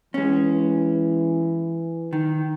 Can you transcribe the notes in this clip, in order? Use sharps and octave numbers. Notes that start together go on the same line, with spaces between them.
E3 G#3 C#4
D#3